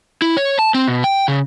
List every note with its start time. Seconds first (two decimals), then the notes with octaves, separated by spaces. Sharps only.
0.22 E4
0.37 C#5
0.59 A5
0.74 C4
0.87 B2
1.04 G5
1.28 C#3